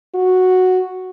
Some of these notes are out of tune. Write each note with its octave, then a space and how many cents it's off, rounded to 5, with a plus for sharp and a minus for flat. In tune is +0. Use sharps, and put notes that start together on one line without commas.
F#4 -5